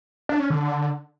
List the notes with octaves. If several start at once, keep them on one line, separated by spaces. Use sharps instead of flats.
D4
C#4
D3